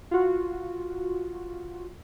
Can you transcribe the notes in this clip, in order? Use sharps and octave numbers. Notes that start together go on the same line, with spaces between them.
F4 F#4